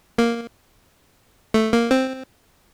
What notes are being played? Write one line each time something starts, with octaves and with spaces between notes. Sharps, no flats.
A#3
A3
A#3
C4